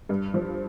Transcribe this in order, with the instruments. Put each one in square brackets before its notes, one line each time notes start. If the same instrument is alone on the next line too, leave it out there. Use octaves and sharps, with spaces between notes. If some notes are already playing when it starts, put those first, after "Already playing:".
[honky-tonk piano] G2
F3